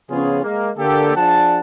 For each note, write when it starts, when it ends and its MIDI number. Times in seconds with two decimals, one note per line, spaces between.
0.11 0.41 49
0.11 0.41 53
0.11 0.41 59
0.11 0.41 61
0.11 0.41 65
0.11 0.41 68
0.43 0.71 56
0.43 0.71 58
0.78 1.12 50
0.78 1.12 58
0.78 1.12 67
0.78 1.12 69
1.16 1.61 53
1.16 1.61 62
1.16 1.61 68
1.16 1.61 74
1.16 1.61 78
1.16 1.61 81